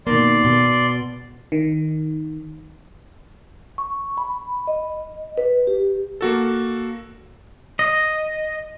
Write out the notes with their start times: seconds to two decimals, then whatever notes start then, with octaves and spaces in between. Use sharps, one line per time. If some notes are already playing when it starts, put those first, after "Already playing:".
0.07 B2 D#3 A#3 D5 C6
0.45 B2
1.52 D#3
3.78 C#6
4.18 B5
4.67 D#5
5.38 B4
5.67 G4
6.21 A#3 F#4 A4
7.79 D#5